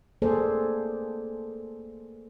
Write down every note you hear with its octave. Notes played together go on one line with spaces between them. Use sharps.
A3 A#3 G#4 A4 C5 D5